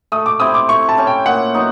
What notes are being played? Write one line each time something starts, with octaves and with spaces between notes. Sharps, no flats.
A3 D#6
D6
C4 E4 G4 D#6
D6
A3 C#6
A5
C#4 E4 G4
G5
A#2 F#5
F#3 B3 D#4